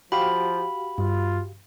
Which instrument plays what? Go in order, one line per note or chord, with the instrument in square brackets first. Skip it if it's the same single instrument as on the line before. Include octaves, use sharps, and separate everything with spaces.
[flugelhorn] F3 [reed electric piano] F#4 G4 F5 [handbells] B5
[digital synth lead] G2 [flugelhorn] F4